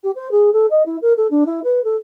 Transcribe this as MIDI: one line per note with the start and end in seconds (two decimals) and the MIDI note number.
0.03 0.11 67
0.15 0.30 72
0.31 0.50 68
0.53 0.66 69
0.70 0.82 75
0.85 0.97 64
1.02 1.13 70
1.17 1.27 69
1.30 1.44 62
1.46 1.60 64
1.64 1.83 71
1.84 1.96 69